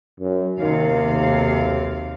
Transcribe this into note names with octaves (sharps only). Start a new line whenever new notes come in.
F#2
D#2 C3 D#3 F5
B1